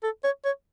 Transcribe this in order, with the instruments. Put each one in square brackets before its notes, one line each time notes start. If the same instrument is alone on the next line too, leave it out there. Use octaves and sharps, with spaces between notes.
[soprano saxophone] A4
C#5
C#5